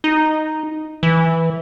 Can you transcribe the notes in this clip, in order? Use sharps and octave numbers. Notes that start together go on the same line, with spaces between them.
D#4
E3